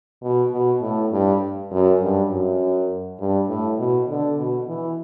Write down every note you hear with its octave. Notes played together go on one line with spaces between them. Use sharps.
B2
B2
A2
G2
F#2
G2
F#2
G2
A2
B2
D3
B2
E3